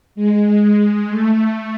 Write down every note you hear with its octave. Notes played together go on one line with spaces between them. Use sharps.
G#3
G#3
A3